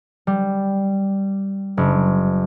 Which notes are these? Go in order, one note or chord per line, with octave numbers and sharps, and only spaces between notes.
G3
F#1